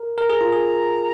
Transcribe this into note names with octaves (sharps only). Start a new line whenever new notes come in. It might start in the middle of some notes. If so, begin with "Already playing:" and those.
Already playing: A#4
A#4 A#5
G#4
F4
G#4